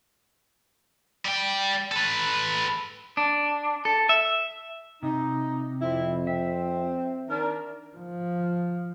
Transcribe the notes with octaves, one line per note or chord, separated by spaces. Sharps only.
G3 G5
A4 B4
D4
A4
E5
C3 D#4
F2 C4 E4
C4 E5
D#3 D4 A#4
F3